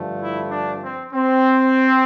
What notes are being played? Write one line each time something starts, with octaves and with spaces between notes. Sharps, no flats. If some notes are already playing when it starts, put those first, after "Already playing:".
Already playing: G2 D3 F3 A3
E4
D4
C4
C4